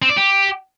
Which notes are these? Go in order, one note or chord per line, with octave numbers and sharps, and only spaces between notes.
C4
D5
G4